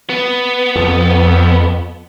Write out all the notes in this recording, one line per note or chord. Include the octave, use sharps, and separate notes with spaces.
B3
F2